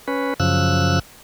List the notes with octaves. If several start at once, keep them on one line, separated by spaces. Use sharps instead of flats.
C#4 B4
F#2 C#3 F3 E6 F#6